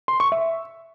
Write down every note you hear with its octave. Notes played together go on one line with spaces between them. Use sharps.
C6
C#6
E5